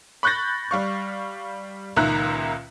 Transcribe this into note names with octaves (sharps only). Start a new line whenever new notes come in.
B5 C#6 F#6 G6 A6 A#6
G3 F5 C#6
C#2 A#2 D#3 E5 A#5 F#6